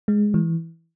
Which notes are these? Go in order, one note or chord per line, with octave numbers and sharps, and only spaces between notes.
G#3
E3